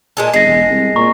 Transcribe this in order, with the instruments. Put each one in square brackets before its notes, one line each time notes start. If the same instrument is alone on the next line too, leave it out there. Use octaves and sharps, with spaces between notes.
[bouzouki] A#2 G#3 A4
[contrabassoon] G1 [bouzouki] G#3 [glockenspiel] A#6 C7
[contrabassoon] E1
C2
[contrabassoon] A#2 [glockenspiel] A#5 C#6